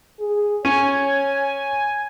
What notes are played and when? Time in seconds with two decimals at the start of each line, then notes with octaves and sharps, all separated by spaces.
0.19 G#4
0.65 C#4 C#5 G#5